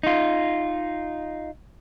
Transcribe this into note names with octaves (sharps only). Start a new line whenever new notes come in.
D#4 F4